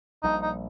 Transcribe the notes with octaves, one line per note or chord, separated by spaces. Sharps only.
A#1 A#2 G3 D#4
D#4